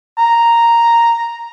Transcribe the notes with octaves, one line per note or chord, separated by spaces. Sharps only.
A#5